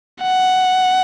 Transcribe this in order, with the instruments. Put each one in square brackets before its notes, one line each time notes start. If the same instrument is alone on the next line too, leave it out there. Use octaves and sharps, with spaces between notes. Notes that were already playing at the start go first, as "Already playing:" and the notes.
[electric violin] F#5